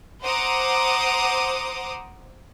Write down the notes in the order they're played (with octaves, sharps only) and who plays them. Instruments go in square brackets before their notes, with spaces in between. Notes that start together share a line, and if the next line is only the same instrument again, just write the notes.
[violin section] C5 F#5 A#5 D6 D#6